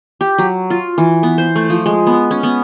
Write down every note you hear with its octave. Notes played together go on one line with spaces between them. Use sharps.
G4
F#3
F4
E3
B3
C5
A3
F3
G#3
B3
C#4
B3